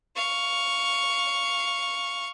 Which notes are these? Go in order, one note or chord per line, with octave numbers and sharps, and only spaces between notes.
F5 C#6